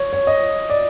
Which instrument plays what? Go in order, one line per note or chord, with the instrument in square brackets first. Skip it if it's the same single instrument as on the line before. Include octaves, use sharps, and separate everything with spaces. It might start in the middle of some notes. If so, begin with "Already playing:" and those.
Already playing: [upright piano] C#5
C#5
D#5
D5